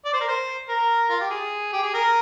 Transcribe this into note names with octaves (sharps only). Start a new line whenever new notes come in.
D5
C5
A#4
C5
A#4
F4
G4
G#4
G4
G#4
A#4